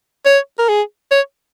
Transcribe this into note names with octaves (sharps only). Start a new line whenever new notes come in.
C#5
A#4
G#4
C#5